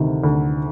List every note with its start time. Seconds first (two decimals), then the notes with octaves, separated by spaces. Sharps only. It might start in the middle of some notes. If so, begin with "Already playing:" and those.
Already playing: D2 C3 D#3
0.24 D2